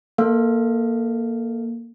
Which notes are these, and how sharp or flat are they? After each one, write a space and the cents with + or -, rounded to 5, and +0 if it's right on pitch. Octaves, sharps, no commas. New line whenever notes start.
A#3 +0 A4 +15 F5 +0